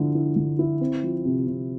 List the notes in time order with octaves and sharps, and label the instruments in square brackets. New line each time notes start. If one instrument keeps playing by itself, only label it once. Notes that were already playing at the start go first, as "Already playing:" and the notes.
Already playing: [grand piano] D3 F3 E4
E4
D3
E4
C4
F3
C3
C3